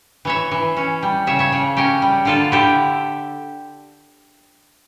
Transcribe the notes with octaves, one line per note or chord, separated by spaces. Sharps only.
E3 C#5 E5
E3
C#4
G3
C#3 C#5 E5
C#5 E5
C#3
C#4 G4 A#4
G3
D3 F4 A4
D3 E4 G4